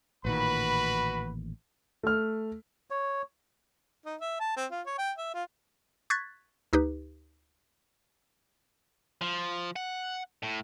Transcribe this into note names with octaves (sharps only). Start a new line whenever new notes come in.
A1 A#2 D#3 F#4 B4 B5
A3 F6
C#5
D#4
E5
A5
C4
F4
C#5
G5
E5
F4
C#6 F#6 G#6 A6 B6
D2 D#4 G4 B4
F3
F#5
A2